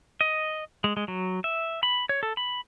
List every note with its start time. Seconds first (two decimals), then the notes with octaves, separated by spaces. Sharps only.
0.21 D#5
0.84 G#3
0.97 G#3
1.08 F#3
1.44 E5
1.83 B5
2.09 C#5
2.23 A4
2.37 B5